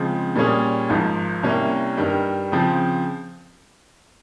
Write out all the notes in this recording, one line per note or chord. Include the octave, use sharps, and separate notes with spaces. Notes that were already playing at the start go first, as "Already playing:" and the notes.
Already playing: C#3 F3 G#3 C4
A#2 G3 C#4 G#4
G#1 G#2 F3
C2 C3 G3 A#3 C#4
G2 D#3 G3
C#3 F3 C4